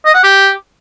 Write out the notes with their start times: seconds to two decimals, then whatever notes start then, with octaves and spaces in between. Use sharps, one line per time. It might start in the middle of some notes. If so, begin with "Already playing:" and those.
0.06 D#5
0.15 F#5
0.23 G4